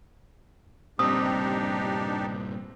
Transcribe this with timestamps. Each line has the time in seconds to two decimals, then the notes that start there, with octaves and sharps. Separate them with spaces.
0.99 G2 A#2 C4 D4 D#4 G4 D#6